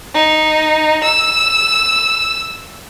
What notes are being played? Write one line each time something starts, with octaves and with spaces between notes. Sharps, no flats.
D#4
E6